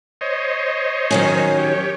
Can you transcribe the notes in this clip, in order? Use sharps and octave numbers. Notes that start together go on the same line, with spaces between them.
C5 C#5 D#5
D#3 F#3 C#4
G4 C#5